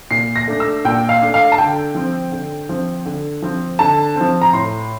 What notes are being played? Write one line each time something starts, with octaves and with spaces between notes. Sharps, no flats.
A#2 C7
A#6
A3 D4
E6
A#2 G5
F5
A3 D4
F5
A5
D3 G5
F3 C4
D3
F3 C4
D3
F3 C4
D3 A5
F3 C4
A#5
A2 C6